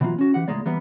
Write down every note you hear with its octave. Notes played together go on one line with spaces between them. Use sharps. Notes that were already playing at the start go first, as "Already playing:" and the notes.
B2 E3 F#3 A#3 F4
C#4 F#4
E3 G4 F#5
C#2 A2 G#3 A#3 D5
E3 G3 A#3 B3